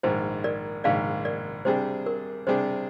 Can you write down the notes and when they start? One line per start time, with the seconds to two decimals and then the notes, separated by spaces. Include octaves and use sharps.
0.03 A#1 G#2 D#3 C5
0.44 A#4 D5
0.84 A#1 G#2 D#3 D5 F5
1.25 A#4 D5
1.65 C3 G3 D4 G#4 C5
2.06 A#4
2.47 C3 G3 D4 G#4 C5